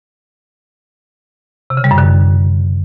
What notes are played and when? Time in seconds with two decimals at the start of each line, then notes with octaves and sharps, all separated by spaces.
1.70 C3
1.77 C#3
1.84 G3
1.91 F#2
1.98 D3